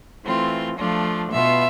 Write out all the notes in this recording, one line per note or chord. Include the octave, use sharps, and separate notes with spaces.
E3 A3 C4 F4
F3 A3 D4 F4
B2 B3 F4 E5